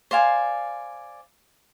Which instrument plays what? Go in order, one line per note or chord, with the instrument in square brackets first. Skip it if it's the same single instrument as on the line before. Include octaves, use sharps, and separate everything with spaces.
[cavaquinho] C5 D5 F5 G#5